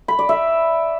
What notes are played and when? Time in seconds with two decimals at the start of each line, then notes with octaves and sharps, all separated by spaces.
0.08 B5
0.19 D5
0.29 E5